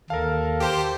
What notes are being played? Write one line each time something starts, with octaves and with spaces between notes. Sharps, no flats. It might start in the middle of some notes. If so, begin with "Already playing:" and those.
D#2 A4 A#4 F5
G4 C5